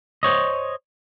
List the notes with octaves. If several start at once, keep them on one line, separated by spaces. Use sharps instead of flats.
C5 C#5 D#5